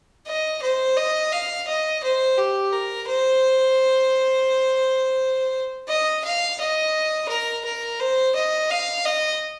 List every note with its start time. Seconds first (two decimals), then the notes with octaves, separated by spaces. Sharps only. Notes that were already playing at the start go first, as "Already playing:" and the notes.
0.27 D#5
0.62 C5
0.97 D#5
1.32 F5
1.68 D#5
2.03 C5
2.38 G4
2.72 A#4
3.08 C5
5.89 D#5
6.24 F5
6.60 D#5
7.29 A#4
7.65 A#4
7.99 C5
8.35 D#5
8.70 F5
9.05 D#5